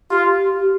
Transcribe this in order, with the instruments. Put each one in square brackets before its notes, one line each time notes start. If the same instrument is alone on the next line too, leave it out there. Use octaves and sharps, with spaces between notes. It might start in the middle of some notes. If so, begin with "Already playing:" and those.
[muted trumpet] F4 [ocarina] G4